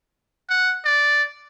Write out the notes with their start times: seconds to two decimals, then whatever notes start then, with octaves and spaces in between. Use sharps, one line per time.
0.50 F#5
0.85 D5